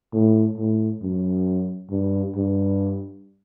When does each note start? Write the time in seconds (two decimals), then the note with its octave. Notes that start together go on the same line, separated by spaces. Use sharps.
0.13 A2
0.58 A2
1.02 F#2
1.91 G2
2.36 G2